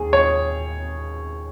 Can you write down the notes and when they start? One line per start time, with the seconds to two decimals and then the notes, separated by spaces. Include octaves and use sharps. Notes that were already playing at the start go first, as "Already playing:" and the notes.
Already playing: D#2 G#4
0.13 C#5